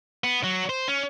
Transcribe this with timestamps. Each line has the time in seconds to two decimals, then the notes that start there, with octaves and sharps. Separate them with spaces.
0.24 B3
0.44 F#3
0.69 C5
0.88 C#4